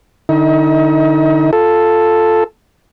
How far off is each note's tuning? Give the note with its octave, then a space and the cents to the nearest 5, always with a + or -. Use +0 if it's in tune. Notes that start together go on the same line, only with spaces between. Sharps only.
D3 +25 D#4 +35 D#5 +45
F4 +0 A4 +0